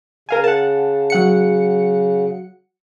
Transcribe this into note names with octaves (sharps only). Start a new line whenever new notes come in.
C#3 A#4 F5 G#5
F#5 A5
F#3 F#5 C#7